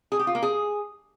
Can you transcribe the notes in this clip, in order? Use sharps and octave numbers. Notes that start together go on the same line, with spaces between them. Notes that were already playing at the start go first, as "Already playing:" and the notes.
G#4
G4
F4
A#3
G#4